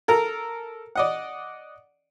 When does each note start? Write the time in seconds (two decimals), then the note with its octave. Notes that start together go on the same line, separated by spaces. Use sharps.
0.08 A4 A#4 A#5
0.96 D5 D#5 F#5